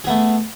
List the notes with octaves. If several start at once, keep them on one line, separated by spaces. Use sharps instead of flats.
A3 B3 G#4